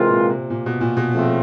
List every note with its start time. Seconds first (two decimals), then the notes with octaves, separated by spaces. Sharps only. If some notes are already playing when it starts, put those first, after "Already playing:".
Already playing: C3 E3 G#3 C4 F4 A#4
0.09 A#2
0.29 C3
0.50 A#2
0.66 B2
0.81 A#2
0.97 B2
1.13 C#3 F3 A3 C4